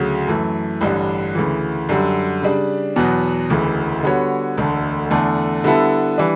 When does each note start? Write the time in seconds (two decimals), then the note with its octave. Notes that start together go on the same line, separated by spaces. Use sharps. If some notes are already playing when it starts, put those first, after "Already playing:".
Already playing: D2 C#3 F#3
0.27 F#2 E3 A3
0.81 A1 G2 D3 G3 D4
1.35 D2 C#3 E3
1.89 F#2 D3 G3
2.42 C#3 G3 D4
2.96 E2 B2 F#3 B3
3.50 E1 D2 C#3 E3
4.03 D3 G3 B3 F#4 C#5
4.57 E1 D2 D3 A3
5.11 E2 D3 A3
5.64 D3 G3 B3 E4 A4
6.18 E3 G3 D4